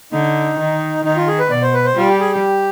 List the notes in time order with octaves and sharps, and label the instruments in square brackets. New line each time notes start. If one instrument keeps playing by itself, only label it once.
[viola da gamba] D3 [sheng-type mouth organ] D#4
[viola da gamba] D#3
[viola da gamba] D#3 [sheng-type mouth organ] D#4
[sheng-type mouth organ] F4
G#4
B4
[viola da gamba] B2 [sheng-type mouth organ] D5
[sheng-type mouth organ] C5
B4
C5
[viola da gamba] G3 [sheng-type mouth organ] F4
[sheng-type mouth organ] G4
G#4
G4